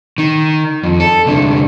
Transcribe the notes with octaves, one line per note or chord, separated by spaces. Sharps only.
D#3
F2
A4
C2 D3